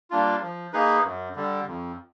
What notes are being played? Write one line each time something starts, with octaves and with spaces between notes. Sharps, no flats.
G3 A#3 D4 F4
F3
A#3 D#4 G#4 B4
F#2
D3 G3
F2